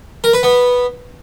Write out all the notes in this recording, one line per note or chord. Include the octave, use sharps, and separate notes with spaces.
A#4
B4
B3